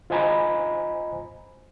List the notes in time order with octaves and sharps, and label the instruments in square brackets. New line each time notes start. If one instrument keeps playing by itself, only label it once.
[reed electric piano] F4 C5 D#5 G#5 A#5 B5